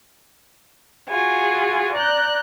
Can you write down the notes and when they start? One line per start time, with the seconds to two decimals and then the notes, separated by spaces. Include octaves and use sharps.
1.09 F4 F#4 G#4 G#5
1.93 D5 A#5 F#6 G6